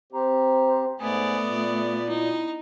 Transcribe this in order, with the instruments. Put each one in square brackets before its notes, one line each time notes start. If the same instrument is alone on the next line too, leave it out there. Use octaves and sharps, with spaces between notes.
[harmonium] C4 G4 [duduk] C5 [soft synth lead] A#5
[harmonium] G#2 G#5 [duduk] A3 [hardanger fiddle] B3 D5 [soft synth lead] D#6
[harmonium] A#2
[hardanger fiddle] D#4 [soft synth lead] E4